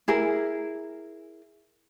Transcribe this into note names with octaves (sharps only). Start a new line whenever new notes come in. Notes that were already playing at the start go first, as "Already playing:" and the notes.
E4 G#4 A#4